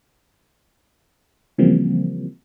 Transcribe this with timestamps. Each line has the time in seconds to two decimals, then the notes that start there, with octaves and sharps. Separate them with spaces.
1.58 C#3 E3 F3 G3 A#3 C4